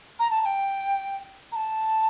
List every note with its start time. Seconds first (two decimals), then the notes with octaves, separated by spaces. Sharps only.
0.19 A#5
0.31 A5
0.41 A5
0.45 G5
1.52 A#5
1.56 A5